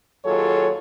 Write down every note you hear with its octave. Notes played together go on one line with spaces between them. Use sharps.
D#2 F#3 F4 G#4 A4 C#5